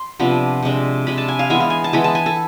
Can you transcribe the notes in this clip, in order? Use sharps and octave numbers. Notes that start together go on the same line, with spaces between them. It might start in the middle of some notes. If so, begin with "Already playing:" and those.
Already playing: C6
C3 F3 B3 D4
C3 G#3 D4
C3 G#3 D4 B5
A5
G#5
F5
E3 G#3 B3 G#5
F5
G#5
A5
E3 G#3 B3 B5
A5
G#5
A4